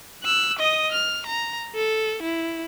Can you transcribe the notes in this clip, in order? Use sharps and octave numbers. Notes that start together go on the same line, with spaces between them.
E6 F#6
D#5 D#6
F6
A#5
A4
E4